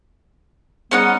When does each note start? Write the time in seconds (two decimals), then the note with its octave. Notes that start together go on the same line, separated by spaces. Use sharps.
0.91 G#2 G3 B3 C#4 D#4 F#5